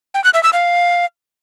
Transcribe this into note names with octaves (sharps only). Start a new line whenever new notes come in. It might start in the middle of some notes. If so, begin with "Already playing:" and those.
G5
F#6
E5
E6
F5